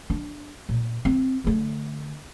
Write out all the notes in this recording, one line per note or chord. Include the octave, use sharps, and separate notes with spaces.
D4
A#2
C4
D3 A3